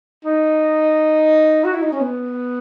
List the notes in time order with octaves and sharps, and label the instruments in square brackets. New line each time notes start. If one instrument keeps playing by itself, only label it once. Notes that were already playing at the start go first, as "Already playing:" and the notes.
[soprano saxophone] D#4
F#4
E4
D#4
C#4
B3